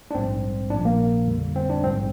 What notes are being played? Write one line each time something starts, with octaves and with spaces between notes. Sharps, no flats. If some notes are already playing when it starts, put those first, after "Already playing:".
D4
A#1 G#2 G3 C4
A#1 A#2 F3 D4
A#3
F2 D3 G3
C4
D4
A#1 G#2 G3 C4